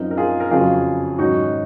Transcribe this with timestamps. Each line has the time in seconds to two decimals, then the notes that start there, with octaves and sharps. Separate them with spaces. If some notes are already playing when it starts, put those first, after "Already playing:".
Already playing: F#2 F3 C4 D#4 A#4
0.11 A#4
0.17 F4 G#4
0.40 A#4
0.51 F2 C#3 F#3 F4 G#4
1.19 G#2 D#3 F#3 C#4 D#4 F#4